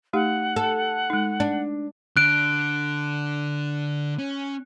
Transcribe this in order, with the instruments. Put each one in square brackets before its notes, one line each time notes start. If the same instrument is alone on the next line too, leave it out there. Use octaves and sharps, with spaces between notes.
[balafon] A3 D#4 G4 [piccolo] F#5
[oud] A4
[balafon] G#3 D#4
[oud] D4
[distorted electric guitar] D3 [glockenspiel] F#6 D7
[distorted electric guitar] C#4